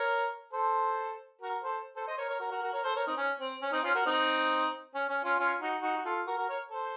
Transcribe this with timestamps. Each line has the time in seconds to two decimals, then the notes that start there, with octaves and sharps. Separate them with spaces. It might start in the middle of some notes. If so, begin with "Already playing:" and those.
Already playing: A#4 C#5
0.53 A4 C5
1.41 F#4 A#4
1.63 A4 C5
1.96 A4 C5
2.08 C5 D#5
2.18 A#4 C#5
2.29 A#4 C#5
2.40 F#4 A#4
2.51 F#4 A#4
2.62 F#4 A#4
2.73 A#4 C#5
2.84 A4 C5
2.96 A#4 C#5
3.06 C4 D#4
3.17 C#4
3.40 C4
3.61 C#4
3.72 C4 D#4
3.84 C#4 F4
3.95 F#4 A#4
4.06 C4 D#4
4.94 C#4
5.09 C#4
5.24 C#4 F4
5.39 C#4 F4
5.60 D#4 F#4
5.82 D#4 F#4
5.97 F#4
6.05 F4 A4
6.27 F#4 A#4
6.37 F#4 A#4
6.49 A#4 C#5
6.71 A4 C5